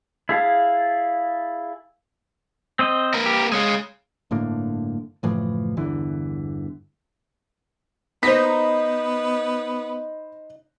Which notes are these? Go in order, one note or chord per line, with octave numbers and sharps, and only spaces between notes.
E4 G#4 F5 A5
C4 C5 D#5
A#3 A#4 B4
G4
G#3 G#4 C#5 F5
G1 A2 D3 A#3
F#1 A2 E3 F3
G1 E2 D3 E3
B3 D#4 C5 D#5 B5 A#6 B6